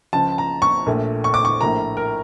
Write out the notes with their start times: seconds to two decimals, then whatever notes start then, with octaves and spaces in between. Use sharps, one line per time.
0.13 C#2 C#3 F3 A5
0.38 A#5
0.62 C#6
0.86 A#1 A#2 A3
1.24 C#6
1.34 D6
1.45 C#6
1.60 A#1 A2 F3 A#3 A#5
1.97 A#4